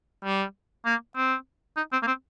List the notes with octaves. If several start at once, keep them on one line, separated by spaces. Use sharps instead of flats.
G3
A#3
C4
D#4
C4
A#3
C4